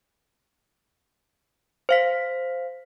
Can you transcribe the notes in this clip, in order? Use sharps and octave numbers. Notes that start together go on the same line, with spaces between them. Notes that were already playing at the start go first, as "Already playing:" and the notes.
C5 F5 B6